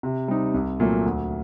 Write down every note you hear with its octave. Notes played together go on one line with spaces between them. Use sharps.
C3
G3 C4 D#4
C2
A#2 F#3 A3
D2